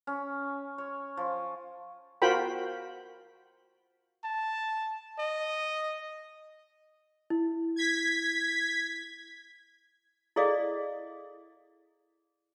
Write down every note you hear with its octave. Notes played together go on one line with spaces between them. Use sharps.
C#4
C#5
F3
F4 F#4 A#4 C5 G5 B5
A5
D#5
E4
G#6 B6
E4 G#4 A4 D5 D#5 F5